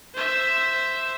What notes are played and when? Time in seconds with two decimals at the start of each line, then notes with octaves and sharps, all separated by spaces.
0.15 C5 E5